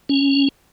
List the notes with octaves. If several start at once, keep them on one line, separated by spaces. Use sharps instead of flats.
C#4